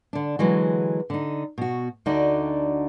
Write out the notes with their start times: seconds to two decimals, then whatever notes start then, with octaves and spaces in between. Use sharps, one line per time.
0.13 D3 D4
0.39 D3 E3 F#3 G#3
1.10 D3 D#4
1.58 B2 F#4
2.06 D2 D3 D4 D#4 F#4 D5